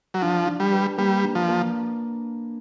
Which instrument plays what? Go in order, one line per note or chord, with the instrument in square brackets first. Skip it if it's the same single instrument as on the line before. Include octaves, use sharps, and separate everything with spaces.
[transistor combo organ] F#3
[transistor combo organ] F3 [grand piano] D4
[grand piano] D4
[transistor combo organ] G3
[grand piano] B4
[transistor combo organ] G3 [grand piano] A#3
[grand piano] D4
[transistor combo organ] F3
[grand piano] A#3